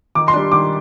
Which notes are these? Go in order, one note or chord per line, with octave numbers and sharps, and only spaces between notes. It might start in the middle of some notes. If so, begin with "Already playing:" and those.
D#3 D6
C6
G3 D4
D#3 D6